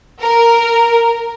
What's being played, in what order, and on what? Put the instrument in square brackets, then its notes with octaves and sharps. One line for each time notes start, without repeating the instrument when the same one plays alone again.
[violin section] A#4